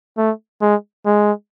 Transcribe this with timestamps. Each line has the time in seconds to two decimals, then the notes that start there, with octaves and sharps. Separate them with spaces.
0.17 A3
0.62 G#3
1.05 G#3